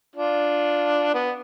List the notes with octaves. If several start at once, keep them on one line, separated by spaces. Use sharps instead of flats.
D4 F4
B3